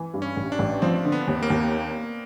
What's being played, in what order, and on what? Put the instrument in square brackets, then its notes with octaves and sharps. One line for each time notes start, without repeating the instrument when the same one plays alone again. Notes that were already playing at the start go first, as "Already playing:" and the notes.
Already playing: [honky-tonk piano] E3
G2
[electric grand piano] C#4
[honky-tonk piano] A1
[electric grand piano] D4
[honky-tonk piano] A1
[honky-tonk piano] F3 [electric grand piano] C4
[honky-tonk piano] D3
[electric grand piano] B3
[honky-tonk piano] D#2
[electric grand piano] A#3
[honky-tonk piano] D#2